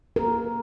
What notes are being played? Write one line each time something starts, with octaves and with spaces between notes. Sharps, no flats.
A#4